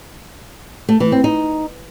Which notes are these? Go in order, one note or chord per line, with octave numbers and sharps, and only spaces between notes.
A3
E3
C4
D#4